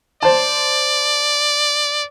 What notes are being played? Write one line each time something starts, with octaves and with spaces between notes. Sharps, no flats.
C5 D5 A5